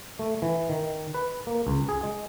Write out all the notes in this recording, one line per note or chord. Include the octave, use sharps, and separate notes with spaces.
A3
E3
D#3
B4
A#3
C#2
G#4
G#3